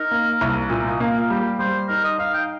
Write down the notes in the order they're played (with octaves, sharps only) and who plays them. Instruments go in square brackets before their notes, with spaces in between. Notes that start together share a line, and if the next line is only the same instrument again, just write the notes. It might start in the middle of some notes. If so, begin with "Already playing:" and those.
Already playing: [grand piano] D#4 [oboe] A#4
[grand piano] A#3
C2
A#2
[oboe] C5
D#5
[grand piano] A#3
[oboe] A#4
[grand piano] G3 [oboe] G4
[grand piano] G3 [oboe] C5
[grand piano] D#4 [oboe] A#4
[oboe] D#5
[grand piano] D#4 [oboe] F5
[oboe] G5